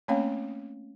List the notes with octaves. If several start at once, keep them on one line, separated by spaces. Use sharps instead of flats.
A3 A#3 C4 C#4 C#5 F5